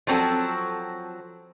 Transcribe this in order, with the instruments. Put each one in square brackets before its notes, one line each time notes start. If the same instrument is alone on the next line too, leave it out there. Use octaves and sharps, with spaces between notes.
[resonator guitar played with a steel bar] F3 F#3 C4 F#4 A4